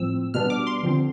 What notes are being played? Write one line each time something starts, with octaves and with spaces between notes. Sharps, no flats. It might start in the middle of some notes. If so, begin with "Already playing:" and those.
Already playing: A2 F3 C4 E6
B2 G3 B3 D4 F6
D6
C6
D3 F3 C4